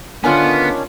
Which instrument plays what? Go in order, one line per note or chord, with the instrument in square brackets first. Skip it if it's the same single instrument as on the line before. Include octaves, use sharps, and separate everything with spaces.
[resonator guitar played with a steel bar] D3 A#4 G#5 [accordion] D#3 C#4 D4 [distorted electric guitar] B3 [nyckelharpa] F4